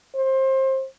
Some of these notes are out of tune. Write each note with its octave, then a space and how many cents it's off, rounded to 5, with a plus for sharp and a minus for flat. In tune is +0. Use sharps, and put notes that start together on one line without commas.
C5 +25